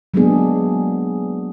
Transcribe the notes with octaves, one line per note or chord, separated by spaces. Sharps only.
F#3 G#3 A#3 B3 D4 G#4